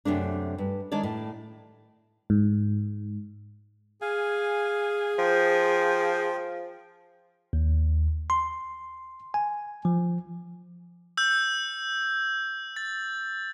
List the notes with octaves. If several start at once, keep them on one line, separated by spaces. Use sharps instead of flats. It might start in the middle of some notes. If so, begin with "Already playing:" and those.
F#2 C3 A3 D4
G2
D#3 G#3 D4 C#5 D5
A2
G#2
G#4 F5 G#5
F3 C5 G5
D#2
C6
G#5
F3
E6 G6
A6